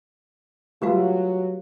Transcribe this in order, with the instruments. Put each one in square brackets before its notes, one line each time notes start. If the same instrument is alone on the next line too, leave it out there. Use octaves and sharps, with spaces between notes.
[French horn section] F#3 [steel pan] G3 A3 F4 [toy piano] G4 B4 F5